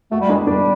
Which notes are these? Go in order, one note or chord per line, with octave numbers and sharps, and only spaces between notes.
A3 F#4
G3
G#3 D4
G3 D4